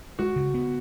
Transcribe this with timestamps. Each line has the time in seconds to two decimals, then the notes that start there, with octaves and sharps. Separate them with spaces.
0.19 G#3 F#4
0.36 C#3
0.54 B3